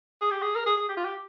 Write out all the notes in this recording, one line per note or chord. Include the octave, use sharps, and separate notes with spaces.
G#4
G4
G#4
A#4
G#4
G#4
G4
F4
G4